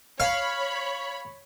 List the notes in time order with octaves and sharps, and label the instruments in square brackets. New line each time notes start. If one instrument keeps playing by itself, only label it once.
[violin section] C#5 B5 [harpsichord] F5